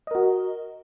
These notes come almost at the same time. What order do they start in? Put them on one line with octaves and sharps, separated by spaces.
D#5 A#4 F#4